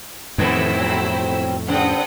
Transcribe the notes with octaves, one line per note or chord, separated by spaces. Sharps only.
F2 A2 C3 D#3 B3 E4 G5 E6
B2 F#3 C4
G2 C#3 C4 F#5 G5 D#6